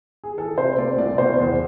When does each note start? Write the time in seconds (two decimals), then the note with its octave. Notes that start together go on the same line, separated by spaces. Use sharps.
0.24 G#4
0.37 E3 A4
0.57 C3 C5
0.78 A3 D5
0.98 C2 D5
1.14 D5
1.18 B2 C5
1.38 E2